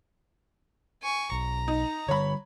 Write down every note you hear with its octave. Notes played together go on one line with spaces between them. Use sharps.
G#5 C#6
B1 A#5
D#4
D3 G3 C#5 B5